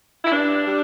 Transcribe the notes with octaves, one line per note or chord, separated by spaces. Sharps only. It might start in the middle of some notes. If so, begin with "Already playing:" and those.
E4
G2 D4
G3